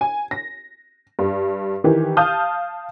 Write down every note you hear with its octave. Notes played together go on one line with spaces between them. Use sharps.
G#5
A#6
G2
D#3 E3 G4
F5 A5 D#6 F6 G6